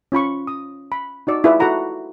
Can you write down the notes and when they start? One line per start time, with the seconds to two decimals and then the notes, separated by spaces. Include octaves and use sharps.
0.12 C#4 F4 B5 C#6
0.47 D#6
0.92 B5
1.27 D#4 F#4 D5 E6
1.44 E4 F4 G#4 B4 D5 E5
1.60 F#4 A4 F#5 A#5 B5